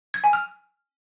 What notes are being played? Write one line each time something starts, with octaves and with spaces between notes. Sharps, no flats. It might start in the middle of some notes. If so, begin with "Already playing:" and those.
G#6
G#5
F6